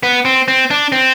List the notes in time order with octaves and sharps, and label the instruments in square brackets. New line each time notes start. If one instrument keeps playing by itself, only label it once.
[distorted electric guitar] B3
C4
C4
D4
C4